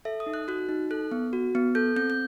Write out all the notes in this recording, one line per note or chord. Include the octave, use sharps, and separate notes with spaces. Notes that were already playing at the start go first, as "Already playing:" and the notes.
A4 E5
D#6
D#4
F#6
F#4 F#6
D#4
A4 F#6
B3
F#4
B3
A4 G6
C4 G6
G6